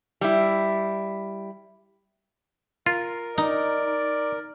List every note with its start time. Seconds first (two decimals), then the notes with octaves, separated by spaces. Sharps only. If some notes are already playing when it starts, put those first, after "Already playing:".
0.21 G3 E4
2.86 F4 A#4
3.38 D#4 D5